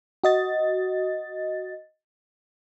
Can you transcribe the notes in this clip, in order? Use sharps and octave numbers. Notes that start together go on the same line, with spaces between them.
F#4 D#5 A6